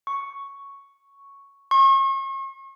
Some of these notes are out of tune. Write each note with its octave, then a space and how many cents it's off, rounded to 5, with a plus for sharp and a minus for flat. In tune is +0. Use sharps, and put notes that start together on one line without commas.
C#6 +0
C#6 -40